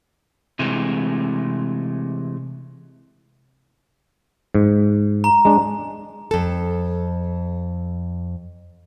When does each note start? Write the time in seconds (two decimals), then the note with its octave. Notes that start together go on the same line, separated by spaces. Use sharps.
0.59 C3 E3 G#3 A3
4.55 G#2
5.24 A#5
5.45 G#3 D4
6.31 F2 A4